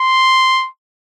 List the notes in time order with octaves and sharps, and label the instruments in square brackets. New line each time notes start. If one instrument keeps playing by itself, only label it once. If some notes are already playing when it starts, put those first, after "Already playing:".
Already playing: [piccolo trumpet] C6